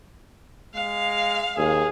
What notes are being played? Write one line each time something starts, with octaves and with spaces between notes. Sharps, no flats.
G#3 F5
D#2 G#4